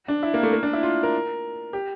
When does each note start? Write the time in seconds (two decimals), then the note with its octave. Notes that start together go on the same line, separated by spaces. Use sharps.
0.08 D4
0.23 E4
0.34 A#3
0.43 A3
0.53 A#3
0.63 D4
0.73 E4
0.83 F4
1.03 A#4
1.73 G4